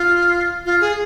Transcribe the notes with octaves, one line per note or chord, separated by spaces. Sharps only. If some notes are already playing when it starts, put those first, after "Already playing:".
Already playing: F4
F4
G#4